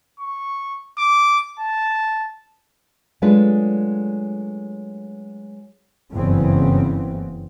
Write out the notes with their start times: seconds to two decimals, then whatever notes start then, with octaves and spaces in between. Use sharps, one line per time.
0.20 C#6
0.98 D6
1.60 A5
3.22 F#3 G#3 A3 D4 F4 B4
6.12 F#1 G2 C#3 E3 B3 C4